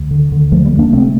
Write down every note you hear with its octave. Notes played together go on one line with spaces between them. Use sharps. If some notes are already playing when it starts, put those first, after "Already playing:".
Already playing: D2
D3
D3
D2 F3 A3
G3 A#3
D2
A#3 D4
C3 A3 C4